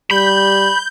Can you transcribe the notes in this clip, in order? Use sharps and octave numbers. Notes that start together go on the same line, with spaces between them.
G3 B5 G6